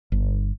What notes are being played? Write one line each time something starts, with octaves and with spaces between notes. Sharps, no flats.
G1